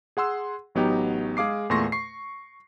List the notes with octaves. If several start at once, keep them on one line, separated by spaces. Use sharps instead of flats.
G#4 F#5 C6 E6
A1 F#3 B3 D#4 G4 G5
G#3 G#4 F5 D6 C7
E2 A#2 A3 C6 C#6 A#6
C#6 C7